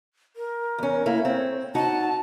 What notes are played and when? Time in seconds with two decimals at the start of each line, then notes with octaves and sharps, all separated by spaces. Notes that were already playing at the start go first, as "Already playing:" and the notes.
0.36 A#4
0.78 E2 C#4
1.06 A3 A#3 E4
1.25 C4 C#5
1.75 D#4 F#4 F#5 A5